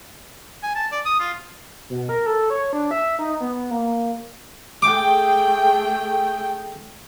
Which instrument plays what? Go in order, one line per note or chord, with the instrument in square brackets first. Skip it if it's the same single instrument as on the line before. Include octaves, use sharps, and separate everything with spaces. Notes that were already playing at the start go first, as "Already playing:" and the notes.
[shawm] G#5
A5
D5
D#6
F4
[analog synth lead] B2
A#4
A4
C#5
D4
E5
D#4
B3
A#3
[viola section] A3 G#4 G5 [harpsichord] D6